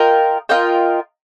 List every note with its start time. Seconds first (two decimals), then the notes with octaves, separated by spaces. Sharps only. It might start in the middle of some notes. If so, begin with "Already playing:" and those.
Already playing: F4 A#4 D#5 G5
0.49 F4 A#4 D#5 G5